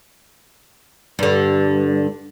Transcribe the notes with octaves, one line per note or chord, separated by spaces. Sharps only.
G2 D3